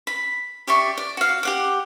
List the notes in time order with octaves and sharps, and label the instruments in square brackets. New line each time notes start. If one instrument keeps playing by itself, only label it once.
[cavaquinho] B5
G4 D5 E5 C#6
D5
F#4 F5
G4 F#5 D6